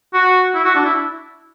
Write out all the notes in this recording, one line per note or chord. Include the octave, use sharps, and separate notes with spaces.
F#4
E4
F#4
D4
E4